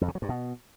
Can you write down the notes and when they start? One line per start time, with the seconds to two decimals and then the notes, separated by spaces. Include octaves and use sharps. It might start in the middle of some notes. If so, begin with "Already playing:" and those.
0.01 F2
0.08 C3
0.15 F#3
0.22 G2
0.29 B2